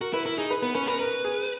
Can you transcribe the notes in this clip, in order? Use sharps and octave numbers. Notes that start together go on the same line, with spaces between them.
F#4 A#4
E4 B4
E4 A#4
D#4 G#4
B4
B3 B4
C#4 B4
A#4 B4
A#4 B4
G#4